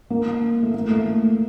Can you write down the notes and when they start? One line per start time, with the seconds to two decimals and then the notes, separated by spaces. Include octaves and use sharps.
0.10 A#3
0.63 A3
0.74 A#3
0.91 A3